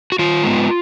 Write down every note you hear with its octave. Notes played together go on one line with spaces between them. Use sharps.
F#4
D#3 F4
G#3 B3